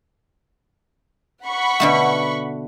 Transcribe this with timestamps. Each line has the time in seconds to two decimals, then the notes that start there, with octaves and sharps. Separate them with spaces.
1.45 F#5 B5 C#6
1.80 B2 D3 A3